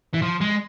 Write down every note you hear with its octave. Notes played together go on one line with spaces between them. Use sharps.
E3
F3
G#3